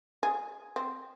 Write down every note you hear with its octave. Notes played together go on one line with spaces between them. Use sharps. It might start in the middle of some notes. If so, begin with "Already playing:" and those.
G#4
C4